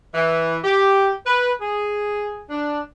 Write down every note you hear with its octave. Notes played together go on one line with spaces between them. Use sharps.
E3
G4
B4
G#4
D4